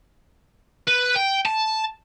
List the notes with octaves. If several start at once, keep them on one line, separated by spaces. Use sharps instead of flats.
B4
G5
A5